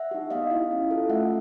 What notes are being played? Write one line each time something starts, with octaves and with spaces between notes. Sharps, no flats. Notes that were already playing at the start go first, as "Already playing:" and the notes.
Already playing: E5 F#5
D#4 G4
B3 D#5 F5
E4 G4
C#4
F4 A4
A3 E5 F#5